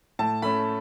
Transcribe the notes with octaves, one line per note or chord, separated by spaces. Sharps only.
A2 A5
A3 C#4 B5